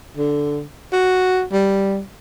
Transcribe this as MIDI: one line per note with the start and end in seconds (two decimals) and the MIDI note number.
0.17 0.64 50
0.93 1.43 66
1.52 2.01 55